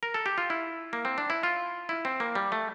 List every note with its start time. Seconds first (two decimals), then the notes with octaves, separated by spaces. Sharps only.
0.03 A#4
0.14 A4
0.26 G4
0.38 F4
0.50 E4
0.93 A#3
1.05 C4
1.18 D4
1.30 E4
1.43 F4
1.89 E4
2.05 C4
2.20 A#3
2.35 G3
2.52 A3